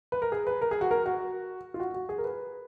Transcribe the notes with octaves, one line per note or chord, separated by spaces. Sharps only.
B4
A#4
G#4
B4
A#4
G#4
F#4
A#4
F#4
F4
F#4
F#4
G#4
A#4
B4